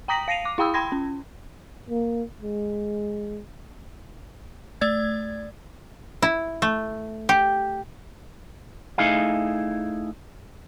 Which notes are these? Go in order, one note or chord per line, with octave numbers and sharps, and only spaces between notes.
G5 A#5 D#6 A#6 B6 F#7
F5 A#6 C7 D#7 F7
D6
E4 F5 G5 B5 D#6 E6
G5 B5 C6 G#6 A#6
C#4
A#3
G#3
A3 D5 G#6
E4
A3
G4
A3 D#4 E4 G#4 F5